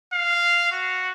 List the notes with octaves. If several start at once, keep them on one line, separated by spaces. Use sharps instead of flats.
F5
F#4